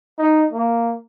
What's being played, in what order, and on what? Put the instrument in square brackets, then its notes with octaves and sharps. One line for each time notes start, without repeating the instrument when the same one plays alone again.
[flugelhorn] D#4
A#3